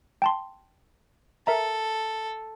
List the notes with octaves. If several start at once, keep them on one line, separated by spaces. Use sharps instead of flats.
G5 A5 C6
A4 A#4 E5 A#5